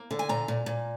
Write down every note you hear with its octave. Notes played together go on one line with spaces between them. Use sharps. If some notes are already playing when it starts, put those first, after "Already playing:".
Already playing: A#3
D3
G#5
A#2 A#5
A#2
A#2